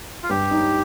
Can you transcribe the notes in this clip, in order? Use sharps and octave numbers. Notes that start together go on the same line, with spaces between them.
F4
G2 G4
D#4